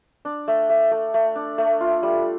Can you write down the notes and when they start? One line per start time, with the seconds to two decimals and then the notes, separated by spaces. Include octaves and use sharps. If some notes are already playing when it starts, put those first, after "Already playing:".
0.25 D4
0.48 A3
0.70 A3
0.91 A3
1.14 A3
1.36 D4
1.58 A3
1.80 F4
2.03 G3